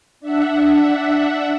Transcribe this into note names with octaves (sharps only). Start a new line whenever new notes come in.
D4 E5 F#5